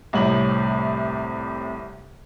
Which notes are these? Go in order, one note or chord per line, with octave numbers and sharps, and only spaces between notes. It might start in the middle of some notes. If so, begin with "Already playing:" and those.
C2 A2 C3 C#5 F#7